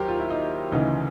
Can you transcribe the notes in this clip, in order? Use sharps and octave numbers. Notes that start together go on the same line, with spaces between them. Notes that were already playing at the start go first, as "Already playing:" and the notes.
Already playing: D#2 D#3 F#3 G4 A#4 C5
F4
E4
D#4
D2 C#3 E3 D#4